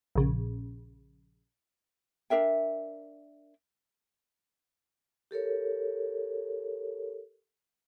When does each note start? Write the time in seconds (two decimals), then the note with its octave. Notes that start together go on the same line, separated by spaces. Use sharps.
0.16 A#1 C#3
2.30 D4 A#4 E5 G5
5.31 G4 A4 A#4 C#5